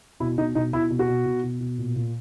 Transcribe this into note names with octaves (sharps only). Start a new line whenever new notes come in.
B2 E4
B2 D#4
B2 D#4
B2 E4
B2
F#4
B2
B2
B2
B2
A#2
A#2